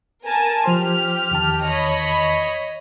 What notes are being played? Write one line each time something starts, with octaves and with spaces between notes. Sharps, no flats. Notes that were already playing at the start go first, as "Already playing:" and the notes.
A#4 G#5 A5
F3 G4 C5 C6 F6
E2 D#3 A5
C#5 D#5 B5